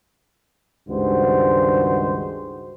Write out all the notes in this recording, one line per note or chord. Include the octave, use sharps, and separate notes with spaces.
C#2 G2 D#3 G#3 F#4 C5